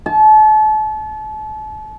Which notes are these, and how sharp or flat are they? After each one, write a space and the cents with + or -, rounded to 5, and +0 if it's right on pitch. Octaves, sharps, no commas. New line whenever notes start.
A5 -35